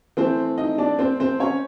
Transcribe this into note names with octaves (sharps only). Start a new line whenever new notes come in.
E3 A3 C4 C5
D#4 D#5
D4 D5
C4 C5
C4 C5
C#4 C#5